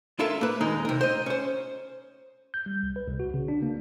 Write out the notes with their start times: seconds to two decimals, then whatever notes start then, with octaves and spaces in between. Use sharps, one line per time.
0.19 E4 F4 A4 A#4 E5 F5
0.41 A#3 B4
0.61 D#2 G#3 A#3 D#4
0.85 C3 A#4
1.01 C5 D#5
1.26 C#4 C5
2.54 G6
2.66 G3
2.83 C2
2.96 B4
3.08 C2
3.20 F#4
3.34 C#3
3.48 D4
3.62 A#3